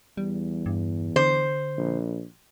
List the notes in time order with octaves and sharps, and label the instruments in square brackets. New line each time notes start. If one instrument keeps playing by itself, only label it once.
[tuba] E2 [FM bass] G3
[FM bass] G2
[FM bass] D3 [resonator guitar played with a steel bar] C5
[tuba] A#1